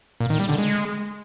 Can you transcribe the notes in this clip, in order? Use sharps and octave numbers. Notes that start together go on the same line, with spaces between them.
A#2
D#3
G3
D3
G#3